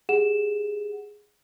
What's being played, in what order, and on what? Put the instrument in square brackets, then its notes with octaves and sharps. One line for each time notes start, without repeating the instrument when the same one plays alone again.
[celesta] G4 G#4 F#5 E7